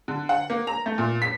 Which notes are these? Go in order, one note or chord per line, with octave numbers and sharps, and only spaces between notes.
D3
F#5
A#3
A#5
A3
A#2
B6